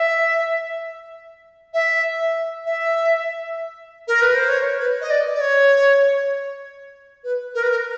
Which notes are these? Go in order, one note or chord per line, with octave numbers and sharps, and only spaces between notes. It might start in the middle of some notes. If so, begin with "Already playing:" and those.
Already playing: E5
E5
E5
A#4
B4
C5
C#5
B4
D#5
D5
D5
C#5
B4
A#4
B4
A#4